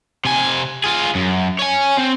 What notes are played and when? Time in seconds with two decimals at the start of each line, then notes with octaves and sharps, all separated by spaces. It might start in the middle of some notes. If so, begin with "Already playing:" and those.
0.25 C3 G#5
0.84 F4 G#4
1.15 F#2
1.59 C#5 G#5
1.98 C4